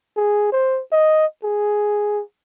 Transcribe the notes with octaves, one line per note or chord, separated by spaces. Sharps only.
G#4
C5
D#5
G#4